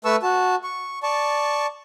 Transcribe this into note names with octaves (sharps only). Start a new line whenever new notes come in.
A3 B4 A5 C#6 E6
F#4 A5
C#6
D5 A5 C#6